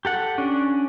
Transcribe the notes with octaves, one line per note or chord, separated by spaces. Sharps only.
G4 A4 F#5
C#4 D4